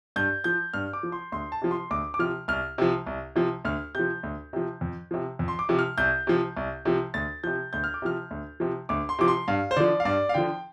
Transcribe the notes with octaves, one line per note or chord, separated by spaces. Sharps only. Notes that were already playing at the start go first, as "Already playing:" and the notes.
G2 G6
F3 G6
G2 F6
D6
F3
C6
D2 C6
A5
C3 F3
C6
D2 D6
D6
C3 F3 F6
C2 F6
C3 F3
C2
C3 F3
D2 F6
C3 F3 G6
D2
C3 F3
F2
C3 F3
F2
C6
D6
C3 F3
F6
C2 G6
C3 F3
C2
C3 F3
D2 A6
C3 F3 G6
D2 G6
F6
D6
C3 F3 F6
D2
C3 F3
D2 D6
C6
C3 F3 D6
C6
G2 F5
C5
D3 F3 D5
F5
G2 D5
F5
D3 F3 G5